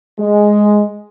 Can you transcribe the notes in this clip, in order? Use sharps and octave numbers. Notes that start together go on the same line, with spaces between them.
G#3